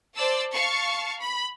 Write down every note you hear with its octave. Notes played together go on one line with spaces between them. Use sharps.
C5 D5 A5 E6
F5 A5 C#6
B5